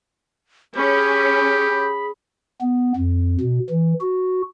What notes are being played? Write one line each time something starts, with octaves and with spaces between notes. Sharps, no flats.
C#4 G4 G#4 B5
B3
F2
B2
E3
F#4